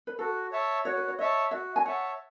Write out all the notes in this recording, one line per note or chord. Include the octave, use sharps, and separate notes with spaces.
B4
F#4 A4
C#5 E5 A5
F#4 C#5
B4
C#5
C#5 D#5 E5 A5
F#4 E5
G#5
C#5 E5 F#5 A5